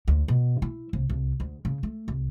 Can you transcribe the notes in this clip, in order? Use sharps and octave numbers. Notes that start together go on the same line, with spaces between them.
D2
B2
E4
C2
C2
D2
C#3
A3
C2